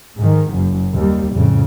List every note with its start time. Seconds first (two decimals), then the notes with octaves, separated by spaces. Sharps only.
0.17 G#2 D#3
0.50 F#1 F#2
0.92 D#2 G3
1.34 F2 A2 C#3